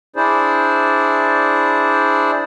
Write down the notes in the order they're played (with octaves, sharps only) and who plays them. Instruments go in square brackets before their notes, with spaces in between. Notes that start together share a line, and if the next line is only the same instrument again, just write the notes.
[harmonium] D4 E4 G#4 C5 D5